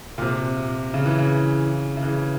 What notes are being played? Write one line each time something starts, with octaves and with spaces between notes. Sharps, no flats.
A#2
C3
C#3
E3
C#3
C#3
E3